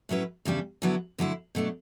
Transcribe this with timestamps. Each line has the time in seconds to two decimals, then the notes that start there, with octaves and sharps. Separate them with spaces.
0.09 A2 F#3 C#4 E4 B4
0.45 E2 C#3 G3 D4 G4
0.82 D3 F#3 B3 E4
1.18 D2 D3 F#3 A3 E4
1.55 B2 F#3 A3 D4